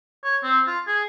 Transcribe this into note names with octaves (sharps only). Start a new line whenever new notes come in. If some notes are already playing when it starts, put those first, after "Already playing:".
C#5
C4
F4
G#4